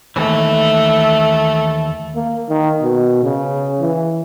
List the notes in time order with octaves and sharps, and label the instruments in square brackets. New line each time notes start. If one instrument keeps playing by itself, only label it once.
[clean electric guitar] D#2 E3 [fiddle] A3
[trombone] A#3
D#3
B2
C#3
E3